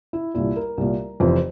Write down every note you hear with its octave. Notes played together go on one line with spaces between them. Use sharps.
E4
C2 A#2 E4
A#4
C2 A#2
F1 F2 E3 C5